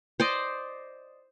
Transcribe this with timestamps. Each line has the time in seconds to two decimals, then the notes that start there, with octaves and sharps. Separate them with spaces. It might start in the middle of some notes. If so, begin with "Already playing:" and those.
0.20 C5 D5 D#5